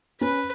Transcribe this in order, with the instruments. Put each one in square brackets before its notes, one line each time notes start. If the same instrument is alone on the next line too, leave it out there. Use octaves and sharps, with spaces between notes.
[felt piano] C#4 [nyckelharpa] B4